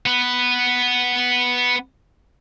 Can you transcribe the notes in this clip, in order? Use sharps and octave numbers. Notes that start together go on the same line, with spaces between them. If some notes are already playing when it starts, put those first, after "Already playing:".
B3 B4